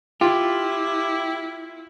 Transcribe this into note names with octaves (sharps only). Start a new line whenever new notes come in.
E4 F4 G4